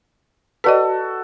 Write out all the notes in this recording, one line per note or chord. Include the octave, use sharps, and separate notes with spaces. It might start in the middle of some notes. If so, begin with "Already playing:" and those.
F#4 A4 B4 D5 D#5